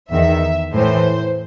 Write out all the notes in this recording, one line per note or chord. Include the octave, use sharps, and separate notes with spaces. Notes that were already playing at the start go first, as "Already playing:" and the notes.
E2 D#3 E5
A2 E3 C5